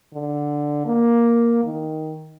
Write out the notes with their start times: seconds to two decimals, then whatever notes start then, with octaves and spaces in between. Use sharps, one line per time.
0.14 D3
0.86 A#3
1.64 D#3